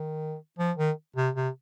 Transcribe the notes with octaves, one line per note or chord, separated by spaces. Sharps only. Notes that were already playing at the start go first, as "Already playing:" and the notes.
Already playing: D#3
F3
D#3
C3
C3